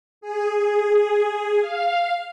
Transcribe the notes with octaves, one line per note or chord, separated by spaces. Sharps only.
G#4
F5